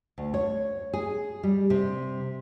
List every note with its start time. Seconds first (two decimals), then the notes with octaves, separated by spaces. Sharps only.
0.18 D2
0.34 C#5
0.93 G#4
1.43 G3
1.70 C3